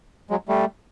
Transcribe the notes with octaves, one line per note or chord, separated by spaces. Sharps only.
F#3 G#3
G3 A3